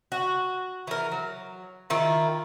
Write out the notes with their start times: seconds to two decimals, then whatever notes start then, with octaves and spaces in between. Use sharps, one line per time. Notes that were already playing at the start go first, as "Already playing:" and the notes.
0.12 F#4
0.87 E3 A#4
1.12 F#3
1.90 D#3 E4 F4